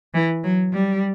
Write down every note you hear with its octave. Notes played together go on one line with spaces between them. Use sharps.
E3
F#3
G3